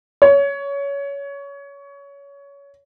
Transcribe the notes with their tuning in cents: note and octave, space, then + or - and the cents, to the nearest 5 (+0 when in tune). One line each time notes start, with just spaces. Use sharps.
C#5 +20